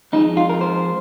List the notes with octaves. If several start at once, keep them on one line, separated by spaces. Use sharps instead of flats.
F2 F3 G#3 D#4
F4
A#4
C5